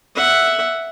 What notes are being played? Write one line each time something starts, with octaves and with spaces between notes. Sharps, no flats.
E5 F#5